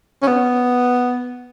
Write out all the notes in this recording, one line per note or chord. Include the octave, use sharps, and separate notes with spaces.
C#4
B3